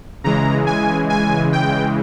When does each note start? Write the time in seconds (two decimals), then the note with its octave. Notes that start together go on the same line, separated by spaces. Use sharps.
0.24 C#3 E3 G#3 A#5
0.66 G#5
1.10 G#5
1.52 G5